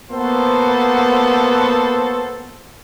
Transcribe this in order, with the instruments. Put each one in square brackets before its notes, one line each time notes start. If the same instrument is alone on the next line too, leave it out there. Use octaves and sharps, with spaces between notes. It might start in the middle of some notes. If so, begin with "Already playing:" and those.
[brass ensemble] A#3 B3 F#4 A4 C5